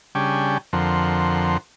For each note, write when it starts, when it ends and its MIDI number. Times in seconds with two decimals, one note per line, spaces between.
0.15 0.58 49
0.15 0.58 55
0.15 0.58 62
0.15 0.58 79
0.15 0.58 80
0.15 0.58 85
0.73 1.57 41
0.73 1.57 50
0.73 1.57 53
0.73 1.57 70
0.73 1.57 78
0.73 1.57 84